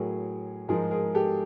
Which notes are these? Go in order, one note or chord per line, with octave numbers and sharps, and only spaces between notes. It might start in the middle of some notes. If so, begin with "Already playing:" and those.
Already playing: A2 F#3 G#4 A#4
G#2 F3 G#3 G#4 A#4
G#4 A#4
G4 A4